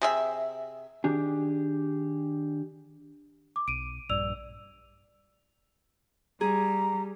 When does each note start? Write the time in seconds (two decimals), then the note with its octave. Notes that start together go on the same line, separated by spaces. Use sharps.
0.02 C3 G#4 E5
1.04 D#3 D4 G4 G#4
3.56 D6
3.68 B1 D7 D#7
4.09 A#1 G2 D5 E6 F7
6.41 G3 G#4 A#5